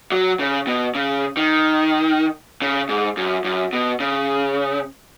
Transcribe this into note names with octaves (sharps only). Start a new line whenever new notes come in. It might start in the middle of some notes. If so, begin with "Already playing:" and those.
F#3
C#3
B2
C#3
D#3
C#3
G#2
F#2
F#2
B2
C#3